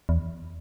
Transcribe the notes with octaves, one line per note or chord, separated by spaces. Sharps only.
E2